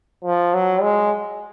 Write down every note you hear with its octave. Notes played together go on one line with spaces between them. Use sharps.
F3
F#3
G#3